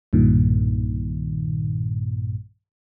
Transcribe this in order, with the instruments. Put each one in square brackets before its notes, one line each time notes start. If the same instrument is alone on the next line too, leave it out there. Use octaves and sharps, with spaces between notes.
[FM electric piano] B1 G2 A#2 D#3